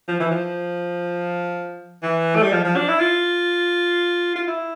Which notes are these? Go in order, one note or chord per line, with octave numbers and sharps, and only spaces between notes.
F3
E3
F3
E3
A3
G3
F3
F3
D4
E4
F4
F4
E4